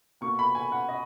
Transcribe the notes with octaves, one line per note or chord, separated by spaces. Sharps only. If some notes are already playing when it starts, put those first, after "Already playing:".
B2 A#3 C#6
B5
G#5
F#5
D#5